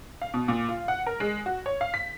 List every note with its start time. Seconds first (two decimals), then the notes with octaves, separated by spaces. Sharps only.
0.21 F5
0.34 B2
0.48 A#2
0.69 F4
0.88 F#5
1.07 A#4
1.20 G#3
1.46 F#4
1.66 C#5
1.81 F5
1.94 B6